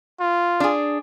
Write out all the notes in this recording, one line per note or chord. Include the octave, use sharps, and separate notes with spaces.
F4
D4 G#4